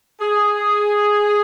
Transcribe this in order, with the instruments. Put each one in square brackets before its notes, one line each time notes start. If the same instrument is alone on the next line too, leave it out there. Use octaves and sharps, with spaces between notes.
[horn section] G#4